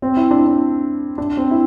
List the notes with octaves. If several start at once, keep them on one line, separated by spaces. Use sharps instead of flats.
C4
E4
D4
D4
D4
C4
E4